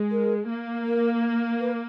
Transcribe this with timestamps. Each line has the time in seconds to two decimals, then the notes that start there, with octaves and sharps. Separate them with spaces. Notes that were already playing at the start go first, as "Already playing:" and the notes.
Already playing: G#3
0.11 A#4
0.49 A#3
0.86 A#4
1.60 B4